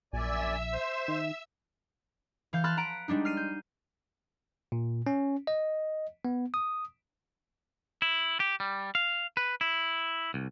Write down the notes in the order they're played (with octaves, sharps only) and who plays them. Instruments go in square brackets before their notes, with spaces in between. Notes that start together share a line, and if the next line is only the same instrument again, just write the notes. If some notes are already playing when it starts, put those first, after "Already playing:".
[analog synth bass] A#1 [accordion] F#2 D5 G#5 [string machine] E5 E6
[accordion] C5
[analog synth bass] D#3
[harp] E3 F5 G6
A5 B5 C6 F6 F#6 A6
F#5 A#5 B6 D7
G3 G#3 D4 D#4
F6 C7 D#7
G6
[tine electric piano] A#2
C#4
D#5
B3
D#6
[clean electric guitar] E4
G4
G3
F5
B4
E4
C2